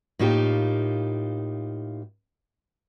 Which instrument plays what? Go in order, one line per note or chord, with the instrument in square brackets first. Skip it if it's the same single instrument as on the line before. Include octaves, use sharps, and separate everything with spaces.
[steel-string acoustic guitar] A2 A#3 D#4 F4 G4